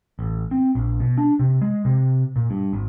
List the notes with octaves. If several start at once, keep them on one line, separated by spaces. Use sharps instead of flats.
A1
C4
A#1
B2
D4
C3
G#3
C3
A#2
G2
G#1